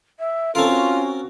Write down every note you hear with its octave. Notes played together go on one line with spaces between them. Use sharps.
E5
C4 C#4 F4 A4 A#4
F#4